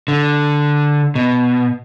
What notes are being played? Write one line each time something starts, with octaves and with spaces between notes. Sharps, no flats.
D3
B2